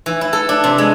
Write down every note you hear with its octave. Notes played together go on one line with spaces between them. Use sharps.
E3
E4
A4
D4
C3
G#3